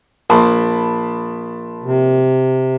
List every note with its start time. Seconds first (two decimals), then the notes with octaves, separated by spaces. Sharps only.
0.30 A#1 A5 B5 C6
1.84 C3